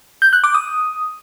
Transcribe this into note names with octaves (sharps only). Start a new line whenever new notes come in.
G6
F#6
D6
D#6